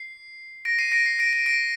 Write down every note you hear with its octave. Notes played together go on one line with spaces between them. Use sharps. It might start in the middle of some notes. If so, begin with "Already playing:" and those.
Already playing: C7
A#6 D7
C7 D#7
A#6 D7
C7
A#6 D7
A#6 D7
A#6 D7